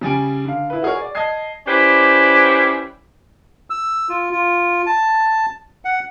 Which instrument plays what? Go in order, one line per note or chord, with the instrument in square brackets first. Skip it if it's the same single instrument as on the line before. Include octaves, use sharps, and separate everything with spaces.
[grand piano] C#3 G3 G#5 D7
D3 F5
E4 B4
F#4 G#4 A#4 C#5
D5
D#5 A5 D#6 G#6 C7
[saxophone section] C#4 E4 G4 B4 C5 D5
[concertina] E6
F4
F4
A5
F#5